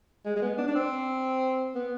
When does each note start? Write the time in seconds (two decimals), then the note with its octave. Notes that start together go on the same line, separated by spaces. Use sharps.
0.25 G#3
0.36 G#3
0.42 B3
0.58 D4
0.68 D4
0.75 C4
1.75 B3